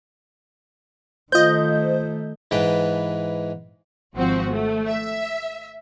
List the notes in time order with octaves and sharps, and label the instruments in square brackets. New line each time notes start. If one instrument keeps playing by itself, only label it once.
[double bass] D#3 A3 [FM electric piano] F4 C5 [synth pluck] D#5 G6
[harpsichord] G#2 E3 B4 G5
[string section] G#1 F3 C4 F#4
A3
E5